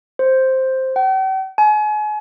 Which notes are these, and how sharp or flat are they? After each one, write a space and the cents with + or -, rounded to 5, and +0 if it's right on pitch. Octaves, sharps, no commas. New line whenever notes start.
C5 +5
G5 -45
G#5 +35